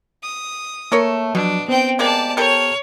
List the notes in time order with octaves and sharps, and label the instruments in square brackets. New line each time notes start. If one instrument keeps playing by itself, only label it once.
[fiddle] D#6
[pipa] A3 A#4 C#5 [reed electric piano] A#3
[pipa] B2 [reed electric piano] F3 F#3 [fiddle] D4
[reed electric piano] B3 C5 [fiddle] C4 G5
[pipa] G#3 A#3 G4 [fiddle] D5 A5
[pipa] G4 A4 A#4 [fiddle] C#5